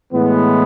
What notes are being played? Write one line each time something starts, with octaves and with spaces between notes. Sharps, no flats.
A2 E3 G#3 B3